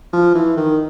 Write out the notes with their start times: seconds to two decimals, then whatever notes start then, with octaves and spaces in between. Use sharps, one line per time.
0.13 F3
0.35 E3
0.57 D#3